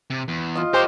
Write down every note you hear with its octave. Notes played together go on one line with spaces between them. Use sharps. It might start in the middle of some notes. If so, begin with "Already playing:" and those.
C3
E2
F4 D#5
G4 A#4 C5 C#5